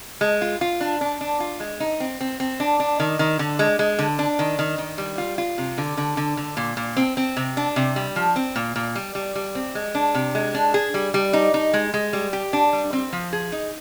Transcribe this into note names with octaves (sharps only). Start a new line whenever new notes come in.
G#3
F4
F4
D4
D4
D4
F4
G#3
D#4
C4
C4
C4
D4
D4
D#3
D#3
D3
G#3
G#3
D3
D4
D#3
D#3
D#3
G3
F4
F4
C3
D3
D3
D3
D3
A#2
A#2
C4
C4
C3
D4
C3
G3
F3
C4
A#2
A#2
G3
G3
G3
C4
G#3
D4
C3
G#3
D4
G#4
G3
G3
D#4
D#4
G#3
G#3
G3
G4
D4
G3
C4
F3
G#4
D#4